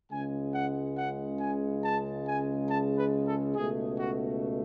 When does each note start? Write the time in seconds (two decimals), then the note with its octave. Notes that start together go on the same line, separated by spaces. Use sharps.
0.11 C#2 C#3 G#3 G#5
0.55 F#5
0.97 F#5
1.40 G#5
1.83 A5
2.27 G#5
2.70 A5
2.99 B4
3.27 A4
3.56 C#2 B2 A3 G#4
3.99 F#4